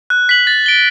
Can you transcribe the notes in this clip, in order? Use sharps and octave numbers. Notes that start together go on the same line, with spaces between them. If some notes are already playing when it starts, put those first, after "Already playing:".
F#6
B6 F#7
A6
D7 G7